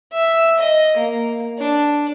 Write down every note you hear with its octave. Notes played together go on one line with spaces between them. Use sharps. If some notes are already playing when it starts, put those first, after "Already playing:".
E5
D#5
A#3
D4